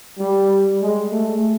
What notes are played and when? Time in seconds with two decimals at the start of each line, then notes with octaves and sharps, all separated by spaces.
0.19 G3
0.82 G#3
1.12 A3